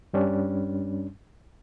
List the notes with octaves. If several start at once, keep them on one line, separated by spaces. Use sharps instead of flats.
G2 G3 C#4 D4